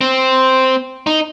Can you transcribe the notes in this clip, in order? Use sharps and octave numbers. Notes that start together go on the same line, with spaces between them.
C4
D#4